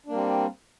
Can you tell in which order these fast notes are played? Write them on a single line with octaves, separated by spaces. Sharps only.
D4 A#3 G3 C4